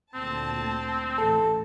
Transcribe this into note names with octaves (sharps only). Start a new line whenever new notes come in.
D2 A#2 C4 A5
A1 A4